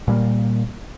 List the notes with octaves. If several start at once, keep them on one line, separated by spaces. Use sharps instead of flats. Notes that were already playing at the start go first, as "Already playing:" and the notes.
A#2 G3 A#3